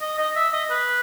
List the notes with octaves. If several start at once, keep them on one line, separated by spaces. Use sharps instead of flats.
D#5
D#5
E5
D#5
B4